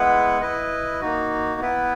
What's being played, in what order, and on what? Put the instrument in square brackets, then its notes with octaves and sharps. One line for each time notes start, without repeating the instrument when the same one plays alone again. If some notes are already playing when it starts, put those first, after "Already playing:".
Already playing: [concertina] G#3 B3 E4 B4 F#5
E4 B4 D#5
A#3 D#4 F#4
B3 E4 B4